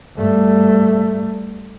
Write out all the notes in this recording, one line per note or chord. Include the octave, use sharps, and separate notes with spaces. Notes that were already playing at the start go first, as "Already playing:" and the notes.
G2 A3